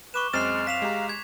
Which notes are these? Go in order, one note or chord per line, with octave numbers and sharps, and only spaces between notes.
B4 C#6 D6 E7
F#2 G#3 C4 F6 F#6 A6 C7 E7
F5 B6 E7 F7
G#3 G4 A#5
G#6